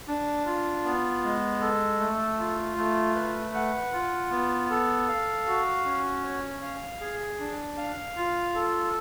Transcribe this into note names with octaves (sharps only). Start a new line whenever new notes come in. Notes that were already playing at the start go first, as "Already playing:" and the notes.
D4
F4
B3
G#3
A4
A3
F4
A3
B4
F#5
F4
B3
A4
F5
F#4
C#4
C#5
F5
G#4
D4
F5
F4
A4